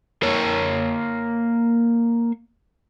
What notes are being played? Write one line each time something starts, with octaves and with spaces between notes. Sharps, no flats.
A#3 C#5